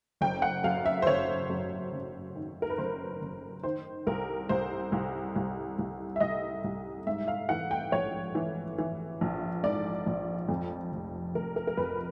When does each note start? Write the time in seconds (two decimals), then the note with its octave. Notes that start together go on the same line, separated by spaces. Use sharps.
0.21 F#1 G5
0.42 F#5
0.64 F#2 F5
0.86 E5
1.02 C5
1.07 F#1 C#5
1.50 F#2
1.92 F#1
2.35 D#3
2.62 A#4
2.70 B4
2.78 F#1 C5
3.21 F#1
3.63 D#3 C5
4.07 C2 A#4
4.49 C2 C5
4.92 C2
5.36 C2
5.79 C2
6.16 E5
6.20 C2 D#5
6.64 C2
7.07 G#2 E5
7.28 F5
7.49 E3 F#5
7.71 G5
7.92 A#1 C#5
8.35 E3
8.78 E3
9.21 A#1
9.63 G#2 D5
10.06 A#1
10.49 F2
10.92 F1
11.35 F1 A#4
11.56 A#4
11.67 A#4
11.77 F2 B4